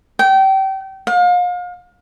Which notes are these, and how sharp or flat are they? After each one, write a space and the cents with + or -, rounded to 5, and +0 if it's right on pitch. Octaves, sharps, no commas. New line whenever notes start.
G5 -30
F5 +35